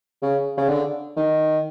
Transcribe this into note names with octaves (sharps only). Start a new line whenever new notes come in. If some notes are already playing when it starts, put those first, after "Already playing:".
C#3
C#3
D3
D#3